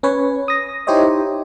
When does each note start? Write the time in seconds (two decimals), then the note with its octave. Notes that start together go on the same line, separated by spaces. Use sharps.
0.03 C#4 B4 C#5
0.48 D#6 A#6
0.87 D#4 E4 G4 C5 C#5 D#5